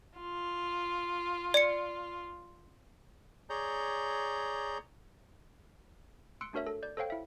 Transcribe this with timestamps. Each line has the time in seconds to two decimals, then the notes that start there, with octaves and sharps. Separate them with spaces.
0.18 F4
1.54 D5 C#7
3.50 G#4 C#5 D5 A#5 G6
6.41 C6 E6 F#6 C#7 D7
6.53 A3 D4 F#4 A#4 C#5 E5
6.67 A4
6.83 D5 G6
6.97 A4 C5 C#5 F5 G5
7.10 E4 E5